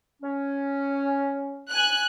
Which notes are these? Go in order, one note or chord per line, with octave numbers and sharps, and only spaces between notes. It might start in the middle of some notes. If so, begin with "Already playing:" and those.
C#4
G#5 F#6